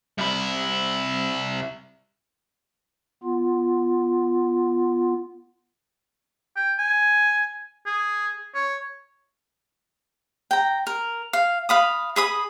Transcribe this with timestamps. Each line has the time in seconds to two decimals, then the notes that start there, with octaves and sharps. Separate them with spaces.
0.18 C2 E4
3.23 B3 F4
6.56 G5
6.79 G#5
7.86 G#4
8.54 C#5
10.51 G5 A#5
10.87 A#4
11.33 F5
11.69 F5 B5 D#6
12.16 G#4 B5 D#6